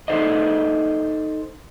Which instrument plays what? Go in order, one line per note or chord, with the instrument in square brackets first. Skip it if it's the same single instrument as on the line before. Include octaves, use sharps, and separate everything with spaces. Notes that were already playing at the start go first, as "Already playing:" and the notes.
[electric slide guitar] D#4 F#4 A4 C5 D5 D#5